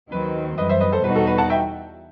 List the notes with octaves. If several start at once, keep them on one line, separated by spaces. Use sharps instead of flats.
D#2 D#3 F#3 C4 B4
F#2 E3 G3 B4 D#5
C5 E5
B4 D#5
A4 C5
E2 B2 G3 D#4 F#4 B4
A4
B4
F#5 A5
E5 G5